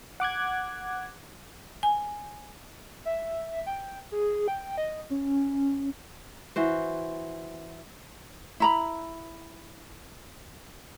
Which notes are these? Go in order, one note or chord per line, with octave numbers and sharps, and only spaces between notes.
F#5 D6 F#6 G#6
G#5
E5
G5
G#4
G5
D#5
C#4
E3 F#4 C5
E4 A#5 B5